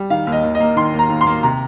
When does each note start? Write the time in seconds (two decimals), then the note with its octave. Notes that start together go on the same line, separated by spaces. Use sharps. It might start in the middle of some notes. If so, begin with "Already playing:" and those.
Already playing: G3
0.10 D#3 F5
0.27 D#2
0.32 D#5
0.43 D#2
0.55 D#5
0.60 A#3
0.76 D#3 C6
0.94 D#2
0.99 A#5
1.09 D#2
1.21 C6
1.27 A#3
1.43 C3 A#5